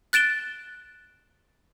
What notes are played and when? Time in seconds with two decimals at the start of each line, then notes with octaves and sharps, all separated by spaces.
0.13 F#6 A6 D7 E7 G7